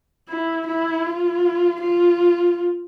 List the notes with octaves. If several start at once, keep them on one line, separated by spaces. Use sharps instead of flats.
E4
E4
F4
F4